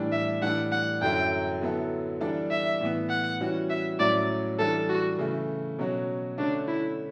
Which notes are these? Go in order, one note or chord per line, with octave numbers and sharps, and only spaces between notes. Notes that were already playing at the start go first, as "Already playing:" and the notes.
Already playing: A2 E3 G3 D4
E5
A2 E3 G3 D4 F#5
F#5
F#2 D3 F#3 C#4 E4 G5
D3 F#3 B3 E4 A4
E3 G3 D4 A4 D5
E5
A2 E3 B3
F#5
E3 G3 C#4 F#4
E5
A2 F#3 C#4 E4 D5
E3 G3 D4 A4
F#4
C#3 E3 A3 E4
B2 F#3 C#4 F#4
D3 A3 C#4 D4
E4